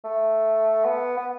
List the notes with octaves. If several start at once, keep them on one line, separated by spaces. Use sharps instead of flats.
A3
B3
B3